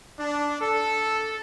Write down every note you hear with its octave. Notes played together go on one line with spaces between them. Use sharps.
D4
A4